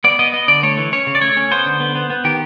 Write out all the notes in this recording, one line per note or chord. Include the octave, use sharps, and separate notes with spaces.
B3 D5
B3 D#5
B3 D#5
D3 D5
A3 C#5
E3
C#4 C#5
C#3
D5
A3 C#5
C#4
B3 C5
D3
B3
B3
B3
D#3 G4